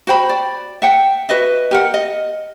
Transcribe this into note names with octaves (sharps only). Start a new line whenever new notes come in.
F#4 C5 G5 B5
D5
E5 F#5 G5
F#4 B4 D#5 E5
G4 A#4 F#5
D#5